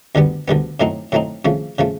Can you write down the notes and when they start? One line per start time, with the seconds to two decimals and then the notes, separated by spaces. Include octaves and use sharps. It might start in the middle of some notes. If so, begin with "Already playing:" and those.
0.15 D2 D3 G3 B3
0.48 D2 D3 G3 B3
0.80 A2 F#3 A3 C4 D#4
1.12 A2 F#3 A3 C4 D#4
1.45 F2 C#3 F3 A3
1.78 C#3 F3 A3